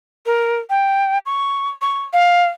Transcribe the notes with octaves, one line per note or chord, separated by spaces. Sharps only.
A#4
G5
C#6
C#6
F5